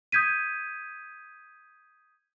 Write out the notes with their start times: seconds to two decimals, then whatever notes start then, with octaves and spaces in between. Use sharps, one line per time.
0.12 D#6 G6 G#6 B6 D#7